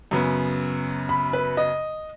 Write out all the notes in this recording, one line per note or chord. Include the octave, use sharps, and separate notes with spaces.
F#2 C#3 F#3 B3
B5
B4
D#5